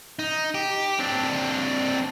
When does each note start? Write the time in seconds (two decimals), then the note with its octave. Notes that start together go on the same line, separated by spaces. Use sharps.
0.19 D#4
0.54 G4
1.00 C4 D4